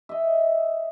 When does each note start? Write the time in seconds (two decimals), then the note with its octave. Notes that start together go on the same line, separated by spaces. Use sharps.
0.09 D#5 E5